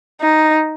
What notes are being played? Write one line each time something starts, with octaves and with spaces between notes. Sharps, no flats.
D#4